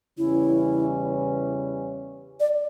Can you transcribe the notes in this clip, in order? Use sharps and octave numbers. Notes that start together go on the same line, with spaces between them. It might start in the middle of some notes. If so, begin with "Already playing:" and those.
E2 C#3 E3 G3 C#4 E4
D5